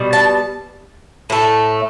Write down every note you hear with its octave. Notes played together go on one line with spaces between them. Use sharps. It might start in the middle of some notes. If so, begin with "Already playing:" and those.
Already playing: B2 G3
A5
A2 A3